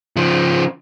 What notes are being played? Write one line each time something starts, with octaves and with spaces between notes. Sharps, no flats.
C#3 F3